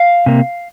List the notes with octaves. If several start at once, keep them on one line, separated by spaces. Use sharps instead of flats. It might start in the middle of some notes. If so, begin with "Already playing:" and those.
Already playing: F5
C3 A#3